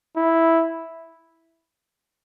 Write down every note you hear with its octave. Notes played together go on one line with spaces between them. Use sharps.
E4